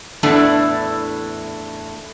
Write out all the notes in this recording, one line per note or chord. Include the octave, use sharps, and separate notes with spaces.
E2 A2 A3 D4 E4 A4